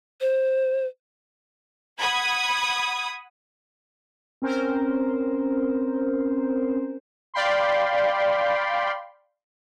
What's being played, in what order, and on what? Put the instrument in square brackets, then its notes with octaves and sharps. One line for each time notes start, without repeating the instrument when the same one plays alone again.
[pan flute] C5
[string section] F#5 B5 D#6 G#6
[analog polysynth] C4 C#4 A#4 C5
D5 F5 G5 B5 C6